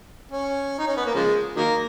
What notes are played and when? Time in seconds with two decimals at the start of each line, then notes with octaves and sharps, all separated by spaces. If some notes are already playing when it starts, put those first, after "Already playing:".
0.32 C#4
0.78 D#4
0.88 C#4
0.97 B3
1.06 A#3
1.15 C#3 F3 G#3
1.56 D#3 F#3 A#3